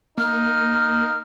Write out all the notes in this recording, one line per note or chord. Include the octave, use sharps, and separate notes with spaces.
A#3 D#4 F6